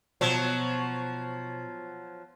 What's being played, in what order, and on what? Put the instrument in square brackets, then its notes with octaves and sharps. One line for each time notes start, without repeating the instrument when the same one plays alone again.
[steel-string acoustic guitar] B2 [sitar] F3 F#3